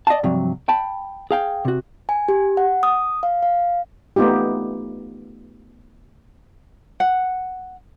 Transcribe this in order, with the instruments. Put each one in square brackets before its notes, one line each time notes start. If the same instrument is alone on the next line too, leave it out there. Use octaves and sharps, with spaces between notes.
[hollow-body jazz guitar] D5 D#5 F5 F#5 A5
G2 C3 F3 F#3
G5 A5 B5
G#4 F5 G5
C3 F#4
[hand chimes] G#5
G4
F#5
D#6
F5
F5
[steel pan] A3 B3 D#4 F4 G4
[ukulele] F#5